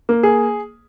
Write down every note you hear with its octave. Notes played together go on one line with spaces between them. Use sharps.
A#3
G#4